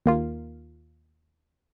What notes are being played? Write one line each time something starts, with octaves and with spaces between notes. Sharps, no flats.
D#2 A#3 F4